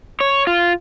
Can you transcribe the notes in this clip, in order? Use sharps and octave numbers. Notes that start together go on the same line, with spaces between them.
C#5
F4